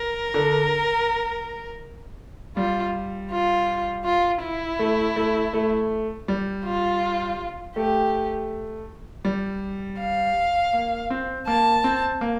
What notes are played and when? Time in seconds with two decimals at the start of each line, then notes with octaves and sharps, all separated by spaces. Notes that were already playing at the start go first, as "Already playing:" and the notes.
Already playing: A#4
0.34 D3
2.57 G3 F4
3.31 F4
4.05 F4
4.43 E4
4.79 A3
5.16 A3
5.53 A3
6.28 G3
6.65 F4
7.76 A3 G4
9.25 G3
9.99 F5
10.73 A#3
11.10 C4
11.47 A#3 A5
11.84 C4
12.21 A#3